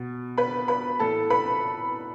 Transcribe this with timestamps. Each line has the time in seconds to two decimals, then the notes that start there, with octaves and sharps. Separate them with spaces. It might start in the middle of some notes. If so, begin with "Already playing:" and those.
Already playing: B2
0.38 B4 B5
0.68 B4 B5
1.00 A2 E3 A4 A5
1.30 B4 B5